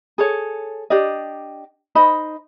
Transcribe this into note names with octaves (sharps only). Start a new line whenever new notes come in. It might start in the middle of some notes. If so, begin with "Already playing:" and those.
G#4 A4 C#5
D4 G4 D5 D#5
D#4 C5 D#5 B5